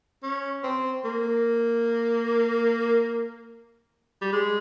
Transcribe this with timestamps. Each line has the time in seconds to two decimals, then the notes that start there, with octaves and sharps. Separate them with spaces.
0.23 C#4
0.64 C4
1.04 A#3
4.21 G3
4.33 G#3